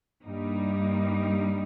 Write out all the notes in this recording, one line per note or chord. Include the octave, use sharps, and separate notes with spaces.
G2 G3 A#3 D#4